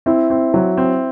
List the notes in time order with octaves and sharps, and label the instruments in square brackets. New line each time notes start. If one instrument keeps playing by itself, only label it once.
[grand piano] C4 [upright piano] E4
[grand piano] C4
F#3
C4